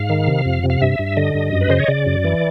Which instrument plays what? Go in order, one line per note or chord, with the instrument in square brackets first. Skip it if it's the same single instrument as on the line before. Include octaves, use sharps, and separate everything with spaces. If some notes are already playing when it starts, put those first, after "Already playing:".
Already playing: [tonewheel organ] G#2 F5
D#3
C3
F2
C3
F5
G2 E5
G2
D3 D#5
G2
F#2
B4
C#3 C5
C#5
C#3 D5
F#2
E3